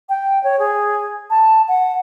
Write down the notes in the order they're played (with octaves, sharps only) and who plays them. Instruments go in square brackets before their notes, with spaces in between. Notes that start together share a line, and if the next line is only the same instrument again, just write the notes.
[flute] G5
C#5
G#4
A5
F#5